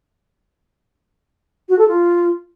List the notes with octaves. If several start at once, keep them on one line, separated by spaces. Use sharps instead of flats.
F#4
A4
F4